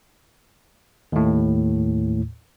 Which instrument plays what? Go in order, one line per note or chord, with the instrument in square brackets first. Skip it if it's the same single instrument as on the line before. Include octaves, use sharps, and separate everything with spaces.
[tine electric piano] D#2 A2